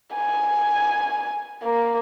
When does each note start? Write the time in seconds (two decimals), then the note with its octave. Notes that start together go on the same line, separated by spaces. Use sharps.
0.15 G#5
1.63 A#3